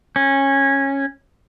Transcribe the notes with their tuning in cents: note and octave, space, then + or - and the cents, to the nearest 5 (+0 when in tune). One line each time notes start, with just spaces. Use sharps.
C#4 -15